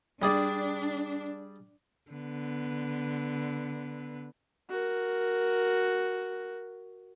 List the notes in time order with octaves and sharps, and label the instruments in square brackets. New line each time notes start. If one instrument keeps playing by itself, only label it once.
[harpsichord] G3 G#4 D5 [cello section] D4
[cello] D3 B3
[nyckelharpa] F#4 A#4